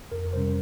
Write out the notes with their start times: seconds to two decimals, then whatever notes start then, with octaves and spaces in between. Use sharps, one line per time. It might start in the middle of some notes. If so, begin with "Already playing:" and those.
0.11 F2 A#4
0.33 C3 G3 C#4 C5